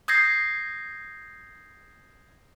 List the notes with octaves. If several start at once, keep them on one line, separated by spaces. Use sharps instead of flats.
D#6 G6 G#6 A#6 C7